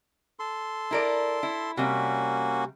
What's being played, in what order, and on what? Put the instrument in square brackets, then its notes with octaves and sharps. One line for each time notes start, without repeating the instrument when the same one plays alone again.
[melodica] A4 C6
[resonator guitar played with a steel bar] E4 A#4 D5
E4
[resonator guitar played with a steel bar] C3 G3 [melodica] A#3 C#4 F#4